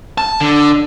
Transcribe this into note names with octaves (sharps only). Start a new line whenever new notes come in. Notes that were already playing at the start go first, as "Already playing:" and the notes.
A5
D3